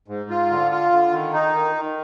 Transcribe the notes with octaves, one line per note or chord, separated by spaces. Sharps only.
G#2
F4
D3
F4
D3
D#3
D#4
D#3
D#3